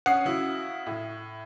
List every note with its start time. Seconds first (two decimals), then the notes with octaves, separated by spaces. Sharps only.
0.06 C#4 F#5 D#6 C7
0.25 C#3 E4 F#4
0.86 A2